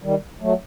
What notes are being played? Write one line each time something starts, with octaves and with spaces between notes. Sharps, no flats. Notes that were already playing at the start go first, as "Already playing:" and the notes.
D#3 G3
F#3 A3